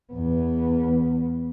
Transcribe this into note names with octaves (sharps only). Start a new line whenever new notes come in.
E2 B3